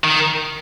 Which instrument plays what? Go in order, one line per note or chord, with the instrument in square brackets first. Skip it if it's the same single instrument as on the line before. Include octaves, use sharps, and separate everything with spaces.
[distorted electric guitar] D#3